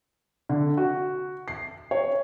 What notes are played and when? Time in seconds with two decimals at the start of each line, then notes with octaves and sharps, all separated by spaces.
0.49 D3
0.77 F#4
1.48 C7
1.91 C#5